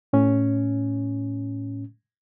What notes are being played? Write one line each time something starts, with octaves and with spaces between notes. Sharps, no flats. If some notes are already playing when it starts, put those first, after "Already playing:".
A2 C#4